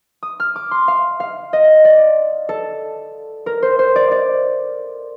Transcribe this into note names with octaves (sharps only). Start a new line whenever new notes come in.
D#6
F6
D6
C6
F5
F5
D#5
D5
A4
A#4
C5
C5
D5
D5